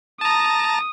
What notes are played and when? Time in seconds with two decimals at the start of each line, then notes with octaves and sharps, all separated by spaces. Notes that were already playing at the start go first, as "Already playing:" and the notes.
0.21 A5 A#5 D#6